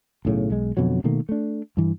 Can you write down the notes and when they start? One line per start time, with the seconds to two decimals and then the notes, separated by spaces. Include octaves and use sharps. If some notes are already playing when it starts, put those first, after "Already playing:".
0.25 B1 A2 C#3
0.50 B1 G#3
0.77 F2 B2 D3 F#3
1.04 B2 D#3 A3 A#3
1.29 A3 D4
1.77 G2 E3